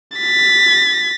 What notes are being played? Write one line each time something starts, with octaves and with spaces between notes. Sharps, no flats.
A6 B6